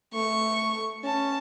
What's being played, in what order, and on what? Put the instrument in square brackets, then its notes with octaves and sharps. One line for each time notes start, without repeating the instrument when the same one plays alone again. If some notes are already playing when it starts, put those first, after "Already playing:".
[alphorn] A3 [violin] C#6
[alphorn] C#4 [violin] A5